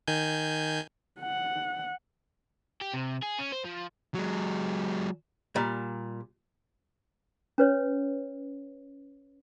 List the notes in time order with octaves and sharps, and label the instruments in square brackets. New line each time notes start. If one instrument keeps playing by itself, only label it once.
[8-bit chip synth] D#3 G#5 G6
[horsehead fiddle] F#5
[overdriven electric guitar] G4
C3
G#4
C#4
C5
F3
[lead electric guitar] F#3 G#3
[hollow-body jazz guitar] A#2 G3
[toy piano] C#4 B4 C#5